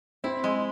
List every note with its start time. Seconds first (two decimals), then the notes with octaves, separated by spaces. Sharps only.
0.24 C4 E4
0.44 G#3